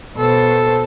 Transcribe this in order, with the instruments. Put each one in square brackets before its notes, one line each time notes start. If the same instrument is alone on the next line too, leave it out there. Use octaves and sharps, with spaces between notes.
[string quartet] B2 C5 [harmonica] A4